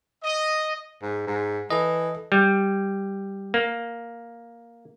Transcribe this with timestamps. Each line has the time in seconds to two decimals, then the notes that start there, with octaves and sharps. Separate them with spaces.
0.24 D#5
1.02 G#2
1.27 G#2
1.71 E3 A4 D#5
2.32 G3
3.54 A#3